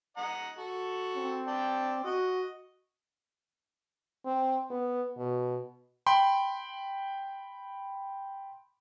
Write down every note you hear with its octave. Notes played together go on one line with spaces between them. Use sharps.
D#5 F#5 A#5
F#4 A4
C4
D5 G5 A5
F#4 D#5
C4
B3
B2
G5 B5 C6